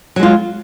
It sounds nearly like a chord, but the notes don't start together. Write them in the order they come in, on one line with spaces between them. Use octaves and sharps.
F#3 G#3 F4